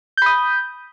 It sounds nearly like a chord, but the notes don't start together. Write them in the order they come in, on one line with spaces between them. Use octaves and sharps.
G6 B5 D#6